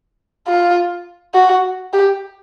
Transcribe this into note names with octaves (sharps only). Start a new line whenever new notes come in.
F4
F#4
G4